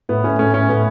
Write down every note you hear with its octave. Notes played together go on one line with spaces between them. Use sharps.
A2 B3
A2 C#4
A3 C#4
A2 C#4
A2 B3